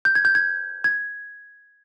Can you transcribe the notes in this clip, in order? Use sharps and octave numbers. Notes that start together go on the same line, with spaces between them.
G6
G#6
G6
G#6
G#6